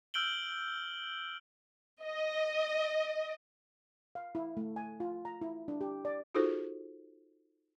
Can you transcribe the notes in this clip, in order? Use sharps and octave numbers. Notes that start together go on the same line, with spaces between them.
E6 F6 G6 D7 F#7 G7
D#5
F5
E4
A3
G#5
F4
A#5
E4
D4
G4
D5
D#4 F4 F#4 G#4 A4 C5